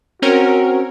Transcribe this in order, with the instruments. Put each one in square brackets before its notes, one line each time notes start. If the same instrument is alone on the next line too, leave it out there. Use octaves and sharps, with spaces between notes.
[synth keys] C4 C#4 A#4 [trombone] F#4